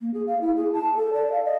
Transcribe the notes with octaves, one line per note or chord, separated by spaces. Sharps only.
A#3
G#4
F5
E4
G#4
A5
A4
D5
F5
D#5